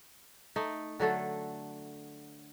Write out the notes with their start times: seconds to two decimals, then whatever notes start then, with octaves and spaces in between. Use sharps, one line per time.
0.56 A3 D#4
1.00 D3 F#3 A3 A4